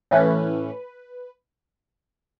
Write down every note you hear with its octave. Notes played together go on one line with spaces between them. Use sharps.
A2 E3 A3 C#4 B4